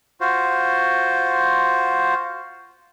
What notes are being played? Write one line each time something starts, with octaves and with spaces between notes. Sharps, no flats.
F4 F#4 C5